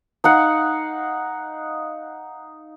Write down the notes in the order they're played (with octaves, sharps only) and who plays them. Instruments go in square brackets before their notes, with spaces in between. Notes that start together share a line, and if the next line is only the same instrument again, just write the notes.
[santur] D#4 F5 F#5